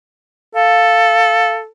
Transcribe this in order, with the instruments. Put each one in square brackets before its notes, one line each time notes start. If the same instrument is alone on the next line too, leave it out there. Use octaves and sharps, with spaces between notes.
[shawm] A4 [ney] F5